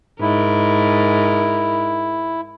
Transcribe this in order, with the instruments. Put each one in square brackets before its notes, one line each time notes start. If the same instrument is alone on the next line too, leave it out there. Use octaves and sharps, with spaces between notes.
[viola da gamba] G#2 A#4 [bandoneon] E4